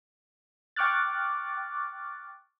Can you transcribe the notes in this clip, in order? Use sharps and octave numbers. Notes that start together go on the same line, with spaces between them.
G5 C#6 D6 F6 F#6 A6